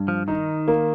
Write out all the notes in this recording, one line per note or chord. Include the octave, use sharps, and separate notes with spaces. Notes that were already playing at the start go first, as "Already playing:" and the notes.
Already playing: G2
F3
D#3 D#4
A#3